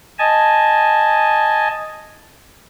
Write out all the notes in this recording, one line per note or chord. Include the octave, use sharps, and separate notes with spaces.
D#5 G#5 A5